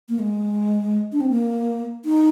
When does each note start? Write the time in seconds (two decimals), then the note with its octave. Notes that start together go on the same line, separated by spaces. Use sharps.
0.09 A#3
0.19 G#3
1.12 D4
1.21 C4
1.30 A#3
2.05 D#4